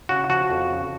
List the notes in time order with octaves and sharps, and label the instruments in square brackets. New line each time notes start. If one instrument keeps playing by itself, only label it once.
[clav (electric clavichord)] C#3 F#4
F3 F#4
F2
C#3